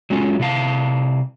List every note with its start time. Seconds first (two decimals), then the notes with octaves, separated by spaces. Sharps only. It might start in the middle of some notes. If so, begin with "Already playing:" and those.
0.10 F#3 G#3 C#4 F4
0.39 C3 E4 F5 A5